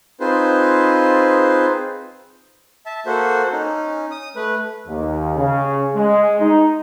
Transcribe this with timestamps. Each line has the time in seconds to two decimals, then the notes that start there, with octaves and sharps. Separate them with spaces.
0.20 C4 D#4 F4 G#4 B4 C5
2.86 E5 A5
3.06 A#3 F#4 A4 C5
3.52 C#4 D#4
4.11 D#6
4.36 A3 B4
4.88 D#2
5.36 C#3
5.95 G#3
6.40 D#4